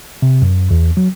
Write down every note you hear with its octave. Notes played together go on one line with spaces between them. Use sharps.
C3
F#2
E2
F#3